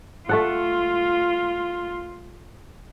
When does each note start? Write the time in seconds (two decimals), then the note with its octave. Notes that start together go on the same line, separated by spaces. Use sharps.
0.29 A3 F4 A4 F#5